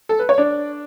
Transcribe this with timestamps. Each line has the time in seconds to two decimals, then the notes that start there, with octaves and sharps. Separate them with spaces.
0.09 A4
0.19 B4
0.29 C#5
0.38 D4 D5